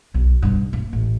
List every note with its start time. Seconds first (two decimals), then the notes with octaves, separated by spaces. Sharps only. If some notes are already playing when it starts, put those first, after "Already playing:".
0.14 B1
0.42 G2 B2
0.73 A#3
0.93 A1